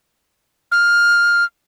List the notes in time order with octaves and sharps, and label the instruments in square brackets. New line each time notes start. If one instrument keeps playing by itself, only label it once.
[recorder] F6